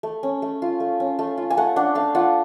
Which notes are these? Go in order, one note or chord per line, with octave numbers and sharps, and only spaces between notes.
A3
C#4
A3
F4
A3
C#4
A3
F4
G#5
A3 F#5
D4 F#5
A3 F5
F4 F#5